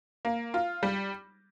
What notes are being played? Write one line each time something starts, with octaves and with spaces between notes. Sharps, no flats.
A#3
F4
G3